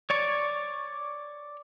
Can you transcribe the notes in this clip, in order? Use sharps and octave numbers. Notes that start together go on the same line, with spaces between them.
C#5 D5 C#6